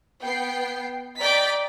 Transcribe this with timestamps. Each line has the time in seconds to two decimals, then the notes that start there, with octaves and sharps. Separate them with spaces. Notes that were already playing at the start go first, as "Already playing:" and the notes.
0.21 B3 G5 C7
1.20 D5 D#5 G5 A#5 B6 D7